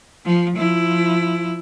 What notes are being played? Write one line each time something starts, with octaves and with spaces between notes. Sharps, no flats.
F3
F3 E4